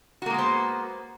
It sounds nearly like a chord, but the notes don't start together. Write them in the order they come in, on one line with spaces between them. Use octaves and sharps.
F#4 A#3 G#3 B3 C5